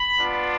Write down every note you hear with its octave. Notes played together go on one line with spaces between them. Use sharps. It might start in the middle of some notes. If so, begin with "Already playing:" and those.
Already playing: B5
B3 D4 F4